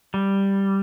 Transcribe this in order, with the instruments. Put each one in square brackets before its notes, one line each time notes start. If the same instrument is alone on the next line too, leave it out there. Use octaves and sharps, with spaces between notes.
[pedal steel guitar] G3